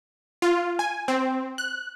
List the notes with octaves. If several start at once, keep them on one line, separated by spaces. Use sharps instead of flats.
F4
G#5
C4
F#6